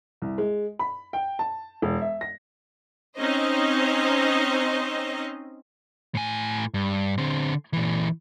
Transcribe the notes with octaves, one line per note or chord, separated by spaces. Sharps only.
C2
G#3
B5
G5
A5
E1
E5
A#6
C4 C#4 D#4 C5 D#5
A2 G#5
G2
D3 C4
A#2 E3